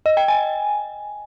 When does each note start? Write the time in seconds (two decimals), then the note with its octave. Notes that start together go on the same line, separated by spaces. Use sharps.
0.06 D#5
0.17 G5
0.28 G#5